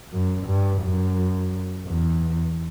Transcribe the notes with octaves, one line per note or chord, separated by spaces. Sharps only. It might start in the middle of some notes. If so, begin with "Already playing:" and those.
F#2
G2
F#2
E2